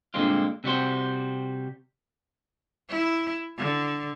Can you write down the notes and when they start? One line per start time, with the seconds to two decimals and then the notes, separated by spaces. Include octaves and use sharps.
0.14 G2 A#2 D3 G#3 C4 F4
0.64 C3 G3 F#4 C5
2.89 E4
3.58 D3